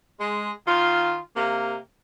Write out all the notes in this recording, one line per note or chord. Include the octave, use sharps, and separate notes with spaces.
G#3
D#3 F4
C3 A#3